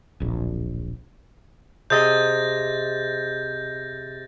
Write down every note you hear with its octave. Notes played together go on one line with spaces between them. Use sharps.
D1 A#1
C3 G#4 D#5 G6 A6 A#6